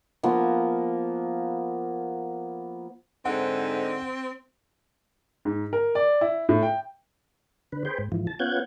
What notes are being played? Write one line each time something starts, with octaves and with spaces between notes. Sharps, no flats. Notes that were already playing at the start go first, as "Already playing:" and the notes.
F3 A#3 B3
G#2 D3 C4 D#4 F#5
G#2
A#4
D5
E4
A2
G5
D3 B4
G#4 B4 C5 G5
G#2
G#2 E3 F3
A5
B3 C#4 F4 F#5 G6 G#6